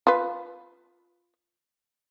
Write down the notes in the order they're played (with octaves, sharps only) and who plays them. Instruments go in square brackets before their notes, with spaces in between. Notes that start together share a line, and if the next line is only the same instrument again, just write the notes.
[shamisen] F4 B4